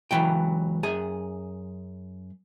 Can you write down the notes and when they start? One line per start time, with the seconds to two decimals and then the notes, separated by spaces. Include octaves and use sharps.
0.11 C#2 C3 E3 F#3 G5
0.83 F#2 G#4 G#5